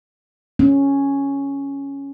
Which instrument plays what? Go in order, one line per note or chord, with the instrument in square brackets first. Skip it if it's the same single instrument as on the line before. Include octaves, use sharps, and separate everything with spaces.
[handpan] C#4